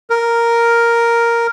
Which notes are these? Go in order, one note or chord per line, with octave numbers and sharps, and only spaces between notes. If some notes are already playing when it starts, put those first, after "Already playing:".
A#4